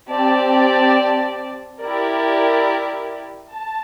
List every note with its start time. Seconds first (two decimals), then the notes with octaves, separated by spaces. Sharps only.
0.11 C4 G4 D5 A5
1.81 E4 G4 A#4 D5
3.53 A5